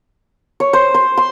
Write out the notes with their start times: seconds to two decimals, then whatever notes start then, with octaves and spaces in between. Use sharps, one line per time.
0.60 C#5
0.73 C5
0.94 C5
1.17 C6